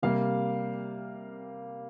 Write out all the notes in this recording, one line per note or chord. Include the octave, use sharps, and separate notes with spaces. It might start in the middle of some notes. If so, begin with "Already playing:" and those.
C3 G3 A#3 F5